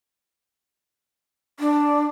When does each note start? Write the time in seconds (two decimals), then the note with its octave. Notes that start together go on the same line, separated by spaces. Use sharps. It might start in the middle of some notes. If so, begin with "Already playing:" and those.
1.60 D4